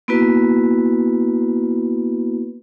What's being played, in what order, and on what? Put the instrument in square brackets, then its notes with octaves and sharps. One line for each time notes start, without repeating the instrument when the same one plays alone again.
[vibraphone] A#3 B3 E4 F#4 B4